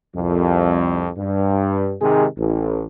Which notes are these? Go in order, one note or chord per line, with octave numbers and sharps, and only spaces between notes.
C2 F2
G2
G#2 C3 D#3 G#3 G4 G#4
A1